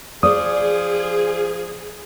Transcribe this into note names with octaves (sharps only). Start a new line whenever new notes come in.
F3 G#4 D5 D#6